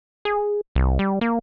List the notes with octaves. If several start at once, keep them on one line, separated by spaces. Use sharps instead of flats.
G#4
C2
G3
A#3